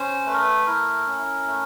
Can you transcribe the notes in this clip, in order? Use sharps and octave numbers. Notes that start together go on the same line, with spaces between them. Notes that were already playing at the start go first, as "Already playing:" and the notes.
Already playing: C#4 C5
A3 B4
A#4
B4
E4 A#4
C#4
A3